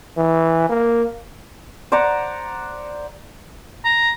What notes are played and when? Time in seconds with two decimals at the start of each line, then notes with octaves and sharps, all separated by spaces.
0.17 E3
0.69 A#3
1.92 C5 D5 F#5 A#5
3.85 A#5